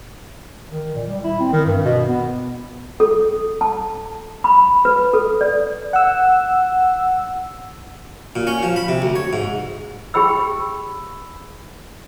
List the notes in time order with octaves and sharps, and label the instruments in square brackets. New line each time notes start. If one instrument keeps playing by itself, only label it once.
[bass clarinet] D#3
A#2
G3
E4
C4
D#3
G2
B2
B3
[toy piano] A4
A5
B5
B4
A4
D5
[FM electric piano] F#5 E6
[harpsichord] A#2
C#4
F3
B5
C3
D2
C#5
G#2
[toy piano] G4 G#4 G5 B5 E6